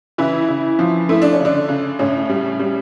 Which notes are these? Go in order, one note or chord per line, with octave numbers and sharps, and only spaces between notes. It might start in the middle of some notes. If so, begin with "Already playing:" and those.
C#3 E3 E4
C#3
F3
A3 E4
D4
C#4
C#3
D3 D4
C#3
A2 C#3 C#4
G3
G3